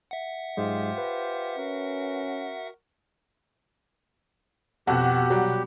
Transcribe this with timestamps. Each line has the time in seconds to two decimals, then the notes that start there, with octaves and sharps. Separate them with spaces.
0.11 E5 F#5
0.57 G#2 F#3 G#3 F4 G4 C5
0.98 B4
1.57 C#4 F#4 A#4
4.87 F2 B2 F#4 G4
5.30 F#3 G3